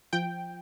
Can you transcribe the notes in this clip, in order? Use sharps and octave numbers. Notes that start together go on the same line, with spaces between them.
F3 G5